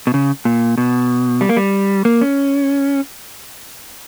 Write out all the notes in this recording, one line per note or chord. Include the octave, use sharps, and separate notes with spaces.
B2
C#3
A#2
B2
G3
A#3
G3
A#3
C#4